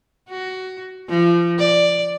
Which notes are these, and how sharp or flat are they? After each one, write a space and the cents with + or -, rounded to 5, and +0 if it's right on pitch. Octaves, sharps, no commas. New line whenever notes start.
F#4 +15
F3 -30
D5 +5